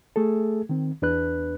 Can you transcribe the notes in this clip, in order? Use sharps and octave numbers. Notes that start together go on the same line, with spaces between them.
A3 G#4 A4
D#3 C4
E2 D4 B4 F#6